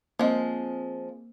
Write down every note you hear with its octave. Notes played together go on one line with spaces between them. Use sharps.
F3 G#3 A#3 C4